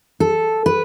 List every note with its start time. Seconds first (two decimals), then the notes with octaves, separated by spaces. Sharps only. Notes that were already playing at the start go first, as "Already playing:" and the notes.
0.20 A4
0.66 B4